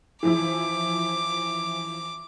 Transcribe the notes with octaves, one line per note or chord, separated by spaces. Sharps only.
E3 F3 E4 D6